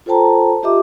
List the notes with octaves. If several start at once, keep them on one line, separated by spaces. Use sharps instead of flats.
F4 A4 C5 G5 A5 A#5
F4 G4 D#5 E5 D6